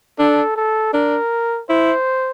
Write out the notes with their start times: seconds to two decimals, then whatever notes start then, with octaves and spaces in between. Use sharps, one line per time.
0.19 D4 A4
0.56 A4
0.94 D4 A#4
1.69 E4 C5